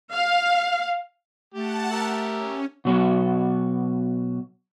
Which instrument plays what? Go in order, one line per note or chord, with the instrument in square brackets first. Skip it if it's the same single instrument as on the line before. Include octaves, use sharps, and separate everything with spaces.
[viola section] F5
[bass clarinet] A3 [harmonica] G4 [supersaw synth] F#5 A5
[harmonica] G4 A#4 E5
[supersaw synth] C#4
[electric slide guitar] B2 F#3 F#4